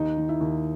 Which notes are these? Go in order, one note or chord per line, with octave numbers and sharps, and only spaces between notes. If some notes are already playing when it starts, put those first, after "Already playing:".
Already playing: D#2 D#4 D#5
D#3
E4 E5
D#2